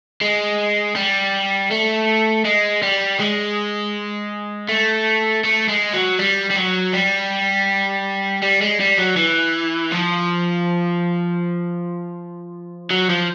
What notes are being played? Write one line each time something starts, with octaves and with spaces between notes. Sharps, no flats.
G#3
G3
A3
G#3
G3
G#3
A3
A3
G#3
F#3
G3
G3
F#3
G3
G3
G#3
G3
F#3
E3
F3
F#3
F3